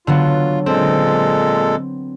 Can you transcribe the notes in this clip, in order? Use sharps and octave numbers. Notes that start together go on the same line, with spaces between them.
D3 F#3 B3 F4
A#2 G#3 C4 A4